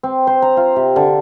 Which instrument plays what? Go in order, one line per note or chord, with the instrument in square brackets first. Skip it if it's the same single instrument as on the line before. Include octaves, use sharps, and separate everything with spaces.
[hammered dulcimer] C4
C5
A#5
F4
C3
D3